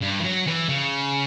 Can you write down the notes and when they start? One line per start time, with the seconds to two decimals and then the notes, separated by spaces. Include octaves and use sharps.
0.02 G2
0.20 E3
0.24 F#3
0.47 E3
0.69 C#3